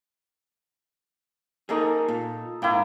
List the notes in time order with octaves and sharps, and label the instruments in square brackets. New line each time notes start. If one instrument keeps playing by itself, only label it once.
[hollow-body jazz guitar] A#3 G#4 [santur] D#4 A4
[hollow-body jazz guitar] A#2
[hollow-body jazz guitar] G#2 G5 [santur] A#3 E4